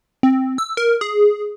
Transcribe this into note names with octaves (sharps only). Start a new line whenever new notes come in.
C4
E6
A#4
G#4